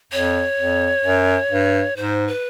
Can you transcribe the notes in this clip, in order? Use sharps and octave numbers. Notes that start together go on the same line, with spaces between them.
F2 C#5
F2
F#2
G2
G#2 C5
B4